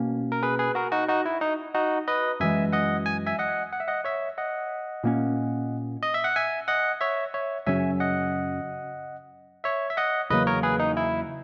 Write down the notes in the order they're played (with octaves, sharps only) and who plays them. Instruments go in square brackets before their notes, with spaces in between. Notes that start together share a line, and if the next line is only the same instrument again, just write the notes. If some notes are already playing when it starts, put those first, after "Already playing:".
Already playing: [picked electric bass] B2 A#3 C#4
[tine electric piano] A#4
G#4 B4
G#4 B4
F#4 A#4
D#4 F#4
D#4 F#4
E4
D#4
D#4 F#4
B4 D#5
[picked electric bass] F#2 E3 G#3 [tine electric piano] E5 G#5
[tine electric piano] D#5 F#5
G#5
E5 G#5
D#5 F#5
F#5
E5
D#5 F#5
C#5 E5
D#5 F#5
[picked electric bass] A#2 A#3 C#4
[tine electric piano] D#5
E5
F#5
E5 G#5
D#5 F#5
C#5 E5
C#5 E5
[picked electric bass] F#2 C#3 F#3 C#4 [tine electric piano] E5 G#5
[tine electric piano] D#5 F#5
C#5 E5
E5
D#5 F#5
[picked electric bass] E2 C#3 F#3 A#3 [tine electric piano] B4 D#5
[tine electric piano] A#4 C#5
G#4 B4
D#4
E4